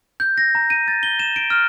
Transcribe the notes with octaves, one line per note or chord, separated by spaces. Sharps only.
G6
A#6
A#5
D#7
A6
G7
E7
D7
F6